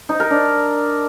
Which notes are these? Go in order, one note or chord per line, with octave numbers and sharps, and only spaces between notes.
D#4
A#4
D4